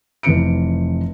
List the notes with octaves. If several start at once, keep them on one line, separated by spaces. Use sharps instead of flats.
F1 E3 C4 C#7 D7